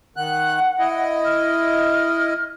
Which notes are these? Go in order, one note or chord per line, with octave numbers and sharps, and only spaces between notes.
D#3 F#5 F#6
E4 D#5
F6